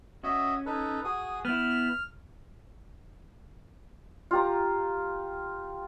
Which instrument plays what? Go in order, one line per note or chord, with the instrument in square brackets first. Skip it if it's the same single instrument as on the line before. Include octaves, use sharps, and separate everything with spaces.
[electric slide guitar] C#4 [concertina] F#4 D#5 E5
[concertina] D#4 A4 B4
F#4 G#4 D#6
[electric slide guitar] B3 E4 [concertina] F6
[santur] F4 G4 A#5